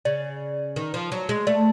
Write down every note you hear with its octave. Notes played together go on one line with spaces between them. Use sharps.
C#3 D5
D#3
F3
F#3
G#3
A3 D5